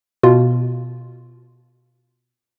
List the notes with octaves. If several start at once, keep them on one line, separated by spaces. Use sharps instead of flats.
B2 F4